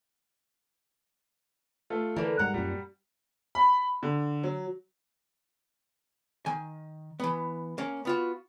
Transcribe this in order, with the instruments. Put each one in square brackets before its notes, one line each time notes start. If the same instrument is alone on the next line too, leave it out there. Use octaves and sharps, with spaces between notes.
[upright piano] A3 F4 A4
[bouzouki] D3 A#3 [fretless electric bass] E3 [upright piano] A#4
[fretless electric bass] G#2 G3 [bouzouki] F#5 A#5
[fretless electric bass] F#2 A#2 [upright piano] G3
[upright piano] B5
D3
F#3
[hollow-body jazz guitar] D#3 G#5
E3 B3
A#3 C#4
B3 F4 F#4